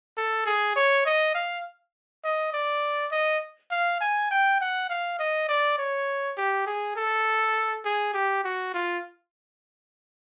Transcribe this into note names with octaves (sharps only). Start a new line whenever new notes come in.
A4
G#4
C#5
D#5
F5
D#5
D5
D#5
F5
G#5
G5
F#5
F5
D#5
D5
C#5
G4
G#4
A4
G#4
G4
F#4
F4